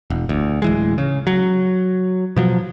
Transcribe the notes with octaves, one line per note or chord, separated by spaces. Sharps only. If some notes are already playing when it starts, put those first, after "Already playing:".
E1
D2
D1 E3 G#3
C#3
F#3
B2 F3 F#3